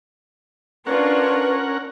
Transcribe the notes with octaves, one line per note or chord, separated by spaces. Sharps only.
C#4 D4 F4 A#4 B4 C#5 F#5